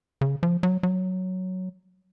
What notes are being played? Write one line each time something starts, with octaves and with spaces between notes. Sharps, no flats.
C#3
F3
F#3
F#3